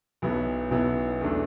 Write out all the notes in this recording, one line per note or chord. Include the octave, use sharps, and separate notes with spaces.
B1 B2 F#3 B3 E4
B1 B2 F#3 B3 E4
E2 B2 A3 D4